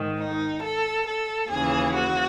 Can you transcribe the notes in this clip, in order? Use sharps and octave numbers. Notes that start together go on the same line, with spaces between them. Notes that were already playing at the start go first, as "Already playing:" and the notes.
Already playing: G#2 D#3
D#4
A4
A4
D#2 C#3 E3 G#4
F#4